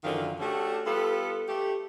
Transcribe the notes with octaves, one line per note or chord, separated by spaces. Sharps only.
F#2 D3 D#3 F3 F5
A3 C#4 D4 F#4 G4
G3 B3 F4 A4
A3 G4